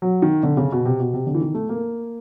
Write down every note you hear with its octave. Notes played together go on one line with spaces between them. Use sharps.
F#3
D#3
D3
C#3
B2
C3
B2
C3
D3
E3
D#3
A3
A#3